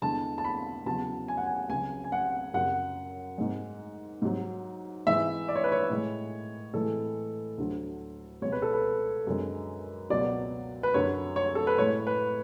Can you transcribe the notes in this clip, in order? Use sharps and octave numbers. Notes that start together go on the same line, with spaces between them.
E2 D3 G#3 A5
A5
B5
E2 C#3 F#3 A5
G#5
F#5
G#5
C#2 C#3 F#3 G#5
G#5
F#5
F#2 C#3 F#3 F#5
G#2 G#3
G#2 F#3
G#2 E3 G#3 E5
D5
C#5
B4
C#5
A2 G#3
A2 E3 G#3 A4
D2 D3 F#3
C#2 B2 G#3 C#5
B4
A4
B4
F#2 D3 G#3
C#2 B2 F#3 D5
B4
F#2 D3 F#3 C#5
C#5
A4
B4
A2 G#3 C#5
B4